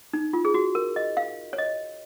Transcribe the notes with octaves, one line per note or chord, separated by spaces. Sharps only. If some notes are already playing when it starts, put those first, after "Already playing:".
D#4
F4
G#4
F#4
A#4
D#5
F5
C#5
D#5